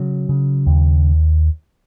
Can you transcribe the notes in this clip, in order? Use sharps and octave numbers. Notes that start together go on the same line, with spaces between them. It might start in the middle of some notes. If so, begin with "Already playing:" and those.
Already playing: C#3 F#3
C#3
D#2